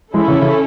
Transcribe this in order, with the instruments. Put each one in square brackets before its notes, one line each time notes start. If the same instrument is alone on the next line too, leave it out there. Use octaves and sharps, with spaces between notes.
[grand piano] E3 G#3 [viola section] C#4 E4 A4
[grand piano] C#3 E3
C#3 E3